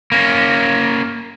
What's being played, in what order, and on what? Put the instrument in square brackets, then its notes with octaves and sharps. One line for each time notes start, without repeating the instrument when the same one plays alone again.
[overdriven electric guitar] A#3 C#4